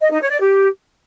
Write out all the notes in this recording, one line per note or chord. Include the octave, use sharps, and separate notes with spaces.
D#5
D#4
C#5
D5
G4